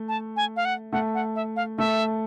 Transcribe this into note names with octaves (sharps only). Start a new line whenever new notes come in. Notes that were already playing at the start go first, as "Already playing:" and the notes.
Already playing: A3
A5
G#5
F5
F#5
A3 F#5
F#5
E5
F5
A3 E5